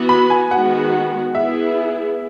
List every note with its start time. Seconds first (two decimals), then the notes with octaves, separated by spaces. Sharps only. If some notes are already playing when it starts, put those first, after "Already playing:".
Already playing: E3 B3 F#4
0.09 B5
0.30 G#5
0.51 D#3 G#3 B3 F#4 F#5
1.35 B3 E4 G#4 E5